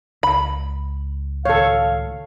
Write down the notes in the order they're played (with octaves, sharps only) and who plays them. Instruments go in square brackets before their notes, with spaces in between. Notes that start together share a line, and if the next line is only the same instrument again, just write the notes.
[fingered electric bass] C#2 [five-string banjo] B5
[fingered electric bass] C#2 A2 D#3 [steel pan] A4 C#5 [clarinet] F5